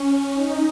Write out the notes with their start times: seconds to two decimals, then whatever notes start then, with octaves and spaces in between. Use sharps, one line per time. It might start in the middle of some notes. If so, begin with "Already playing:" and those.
Already playing: C#4
0.33 D#4